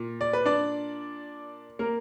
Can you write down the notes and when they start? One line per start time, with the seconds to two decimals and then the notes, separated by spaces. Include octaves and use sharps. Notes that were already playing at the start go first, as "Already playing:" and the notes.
Already playing: A#2
0.21 D5
0.33 B4
0.45 D4 D5
1.79 A#3 A#4